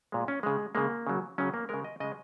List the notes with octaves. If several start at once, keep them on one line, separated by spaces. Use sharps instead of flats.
A#2 G#3
C#4
C#3 G#3
C#3 G#3 A#3
C#3 F#3
C#3 F#3 C#4
A#3
C#3 G#3 A#4
D#5
C#3 G#3 D#5